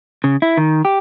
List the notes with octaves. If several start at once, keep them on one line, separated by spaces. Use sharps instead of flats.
C#3
E4
D#3
G4